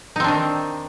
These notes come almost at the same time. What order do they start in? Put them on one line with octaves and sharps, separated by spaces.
D#4 C4 D4 D#3